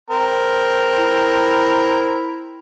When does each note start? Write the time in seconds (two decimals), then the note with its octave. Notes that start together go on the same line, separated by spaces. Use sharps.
0.10 C4 A#4
0.98 E4